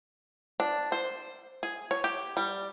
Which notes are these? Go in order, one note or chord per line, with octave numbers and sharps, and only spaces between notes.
D4
C5
G#4
C#5
G4
G3